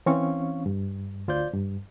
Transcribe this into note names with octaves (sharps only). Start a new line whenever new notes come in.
E3 C4 C#4 F5 C#6
G2
D2 F4 C5 D5 G6
G2